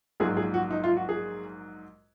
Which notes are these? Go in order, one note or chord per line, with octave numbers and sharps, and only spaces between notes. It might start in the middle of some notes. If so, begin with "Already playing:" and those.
A#1 G#2 F#3 A#3 G#4
G#4
F#4
D#4
F4
F#4
G#4